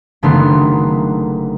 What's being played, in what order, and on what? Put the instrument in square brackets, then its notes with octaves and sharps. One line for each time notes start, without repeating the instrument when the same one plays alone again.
[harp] F#1 D3 D#3 A3 B3 C6